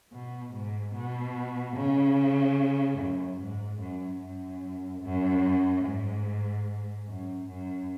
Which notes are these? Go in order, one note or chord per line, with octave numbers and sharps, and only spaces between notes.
B2
G#2
B2
C#3
F#2
G#2
F#2
F#2
F#2
G#2
F#2
F#2